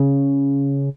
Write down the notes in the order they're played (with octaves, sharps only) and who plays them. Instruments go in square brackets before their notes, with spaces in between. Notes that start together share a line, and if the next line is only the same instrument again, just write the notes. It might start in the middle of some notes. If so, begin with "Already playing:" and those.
Already playing: [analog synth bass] C#3